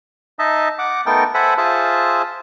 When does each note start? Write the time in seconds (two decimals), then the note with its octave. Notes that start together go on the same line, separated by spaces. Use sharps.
0.39 D#4 D#5 E5 A5
0.79 F#5 D6
1.06 A3 B3 D#4 A4 A#4 G5
1.34 A4 C5 E5 F#5 G#5 B5
1.58 F4 G#4 C5 E5 A5